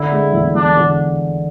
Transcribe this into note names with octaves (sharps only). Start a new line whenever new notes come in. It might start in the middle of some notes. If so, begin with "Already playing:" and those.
Already playing: D3 E4
G#3
E2
E2 D4
D3